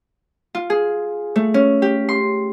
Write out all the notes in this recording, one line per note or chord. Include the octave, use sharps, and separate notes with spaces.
F4
G#4
A3
C#4
G4
C6